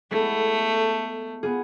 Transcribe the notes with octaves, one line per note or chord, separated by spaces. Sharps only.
G#3 A3 B3 E4 A4
B3 F4 G#4